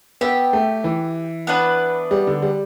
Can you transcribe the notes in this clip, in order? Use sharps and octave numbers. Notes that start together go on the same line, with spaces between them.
B3 G4 E5 G5
A3
E3
B3 D4 B4
G3
D3
G3